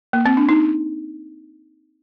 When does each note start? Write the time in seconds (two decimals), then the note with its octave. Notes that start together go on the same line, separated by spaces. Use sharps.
0.13 A#3
0.26 C4
0.37 D4
0.49 D#4